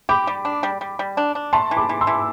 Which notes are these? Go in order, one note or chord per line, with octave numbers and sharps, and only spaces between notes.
G4 B5 D6
G3
D4
G3
G3
G3
D4
D4
A3 A5 C6
E3
B5 D6
E3
C6 E6
E3